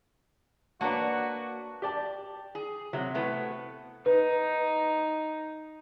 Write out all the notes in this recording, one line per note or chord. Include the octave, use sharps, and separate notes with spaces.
A#3 D4 F#4 B4 C#5 F#5 A5
G4 D5 A5
G#4
C3 F#3
A2 A3 B3
D#4 B4